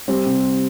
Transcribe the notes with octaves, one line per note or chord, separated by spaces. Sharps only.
G3 C4
C3